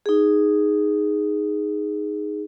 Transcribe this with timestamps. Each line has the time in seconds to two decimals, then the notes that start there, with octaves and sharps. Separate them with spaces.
0.06 D#4 G#4